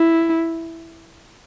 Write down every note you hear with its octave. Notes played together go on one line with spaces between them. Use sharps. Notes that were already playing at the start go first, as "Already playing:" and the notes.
Already playing: E4